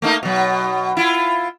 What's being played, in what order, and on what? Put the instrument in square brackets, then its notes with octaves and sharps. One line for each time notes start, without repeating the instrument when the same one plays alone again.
[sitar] A3 A#3 D#4
B2 F#3
E4 F4